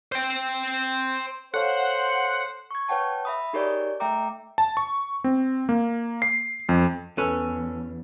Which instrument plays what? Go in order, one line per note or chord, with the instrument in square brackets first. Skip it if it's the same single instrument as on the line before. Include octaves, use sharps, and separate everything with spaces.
[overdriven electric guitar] C5 G5
[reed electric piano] A4 C#5 F5 [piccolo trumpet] C5 [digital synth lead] F#5
[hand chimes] C#6 G#6
B4 C#5 F#5 G5 A5
E5 B5 D#6
D#4 G4 G#4 A#4 C#5 D5
A3 E5 G5 A#5 D6
[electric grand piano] A5
C#6
C4
A#3
C7
F2
[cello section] E2 [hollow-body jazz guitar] C#4 [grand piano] A4 [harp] B4